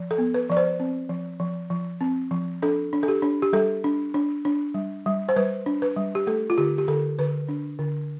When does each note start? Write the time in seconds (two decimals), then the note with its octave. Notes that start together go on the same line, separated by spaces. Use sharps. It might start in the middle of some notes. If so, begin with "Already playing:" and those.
Already playing: F3
0.11 A4
0.18 B3
0.34 B4
0.50 F3 D5
0.57 C5
0.80 C4
1.09 F3
1.40 F3
1.70 F3
2.01 C4
2.31 F3
2.62 D4 A4
2.93 D4
3.03 A4
3.08 G4
3.22 D4
3.42 G4
3.53 G3 A4
3.84 D4
4.14 D4
4.45 D4
4.74 G3
5.06 G3
5.29 C5
5.36 G3 B4
5.66 D4
5.82 B4
5.97 G3
6.15 G4
6.27 A3 A4
6.50 F4
6.58 D3 G4
6.78 G4
6.88 D3 A4
7.19 D3 B4
7.49 D4
7.79 D3